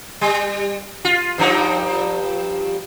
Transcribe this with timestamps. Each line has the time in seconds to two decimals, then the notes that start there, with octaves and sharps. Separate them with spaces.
0.21 G3
1.05 F4
1.38 G2 F3 D#4